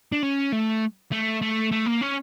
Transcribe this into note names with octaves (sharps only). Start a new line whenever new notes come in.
D4
C#4
A3
A3
A3
A3
A#3
C#4